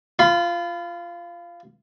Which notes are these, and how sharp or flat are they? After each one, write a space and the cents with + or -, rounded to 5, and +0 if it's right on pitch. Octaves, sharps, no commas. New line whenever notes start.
F4 -15 B5 +30